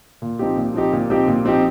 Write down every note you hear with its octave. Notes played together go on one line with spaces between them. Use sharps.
A#2
F3 C4 D#4 G4
A#2
F3 C4 D#4 G4
A#2
F3 C4 D#4 G4
A#2
F3 C4 D#4 G4